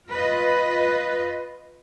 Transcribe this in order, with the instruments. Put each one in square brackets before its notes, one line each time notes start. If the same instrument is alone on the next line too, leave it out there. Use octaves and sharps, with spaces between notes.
[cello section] F4 B4 D#5